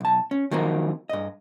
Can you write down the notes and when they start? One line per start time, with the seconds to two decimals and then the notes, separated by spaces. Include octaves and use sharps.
0.01 B1 A5
0.31 C#4
0.51 D#3 F3 F#3 A#3 C4 D#4
1.09 G2 D#5